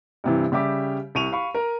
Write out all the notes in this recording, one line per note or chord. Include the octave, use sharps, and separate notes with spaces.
G2 C3 E3
C#3 G3 G4 E5 D6
C2 C#6 D#7 F7
F5 B5 C#6
A#4